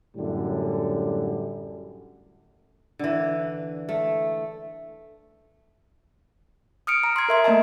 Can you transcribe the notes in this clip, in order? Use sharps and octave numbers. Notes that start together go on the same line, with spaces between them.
F#2 A2 D3 G3
D3 E3
A3
D#6 F6 C#7 D7
A#5
C6 G#6
A#4 E5 C6
A3 A#3 D#5 E5 A5